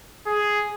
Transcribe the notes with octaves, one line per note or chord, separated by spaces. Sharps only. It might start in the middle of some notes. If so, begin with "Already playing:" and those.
G#4